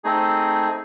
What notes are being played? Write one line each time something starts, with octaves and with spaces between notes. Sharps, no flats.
A3 C4 D#4 G#4